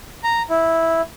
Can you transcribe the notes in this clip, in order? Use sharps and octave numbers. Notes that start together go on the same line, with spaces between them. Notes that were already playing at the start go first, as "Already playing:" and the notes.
A#5
E4